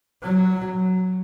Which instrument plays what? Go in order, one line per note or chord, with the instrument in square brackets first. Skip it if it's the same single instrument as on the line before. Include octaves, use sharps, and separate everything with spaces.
[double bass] F#3